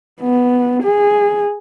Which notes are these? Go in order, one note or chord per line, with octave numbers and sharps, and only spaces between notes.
B3
G#4